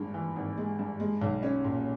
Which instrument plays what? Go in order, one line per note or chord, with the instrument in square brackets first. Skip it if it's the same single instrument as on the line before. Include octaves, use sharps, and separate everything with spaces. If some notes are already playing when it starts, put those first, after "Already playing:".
Already playing: [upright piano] G#1 G2 G#3
E3
G#1
G#3
G2
G#3
B1
C#4
A#2